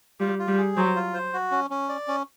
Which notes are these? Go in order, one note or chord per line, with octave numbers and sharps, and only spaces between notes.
G3 F4
F4
G3
G#4
F#3 C5
F4
C5
F#4
C#4
C#4
D5
C#4